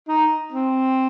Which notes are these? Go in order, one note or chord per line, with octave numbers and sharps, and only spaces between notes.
D#4
C4